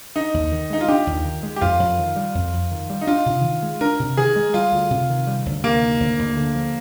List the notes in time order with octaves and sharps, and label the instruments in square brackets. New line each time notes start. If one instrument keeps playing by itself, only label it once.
[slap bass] D4 [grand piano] D#4
[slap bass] D#2
D#3
[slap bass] G#3 [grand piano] D#4
[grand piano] F4
[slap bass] D4 [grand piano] G4
[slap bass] D#2
D#3
G#3
[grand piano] G4
[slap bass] F2 [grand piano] F4
[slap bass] F2
D#3
G3
F2
F2
D#3
G3
[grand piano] D#4
[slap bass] D4 [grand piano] F4
[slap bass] C3
D#3
G#3
[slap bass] D4 [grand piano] A#4
[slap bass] C3
[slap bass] D#3 [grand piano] G#4
[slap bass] G#3
[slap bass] G3 [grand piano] F4
[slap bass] D2
C3
D#3
G3
D2
[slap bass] C3 [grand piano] A#3
[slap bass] D#3
D2
D2
D3
F3